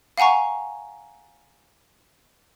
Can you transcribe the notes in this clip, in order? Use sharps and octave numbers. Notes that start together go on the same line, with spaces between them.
F5 F#5 G#5 A#5 C#6